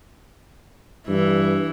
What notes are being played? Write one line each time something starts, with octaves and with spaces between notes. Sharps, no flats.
G2 E3